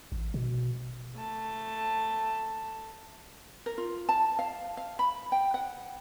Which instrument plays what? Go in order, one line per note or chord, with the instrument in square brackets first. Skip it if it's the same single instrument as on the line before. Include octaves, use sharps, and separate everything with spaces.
[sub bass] A1
B2
[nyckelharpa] A3 A5
[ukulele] A#4
F4
A5
F5
F5
B5
G5
F#5